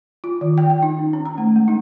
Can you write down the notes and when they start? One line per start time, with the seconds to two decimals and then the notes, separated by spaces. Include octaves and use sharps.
0.24 F4
0.41 D#3
0.58 G5
0.70 G5
0.83 D#4
0.99 C#4
1.13 C#4
1.25 A#5
1.38 A3
1.56 G#3
1.68 D#4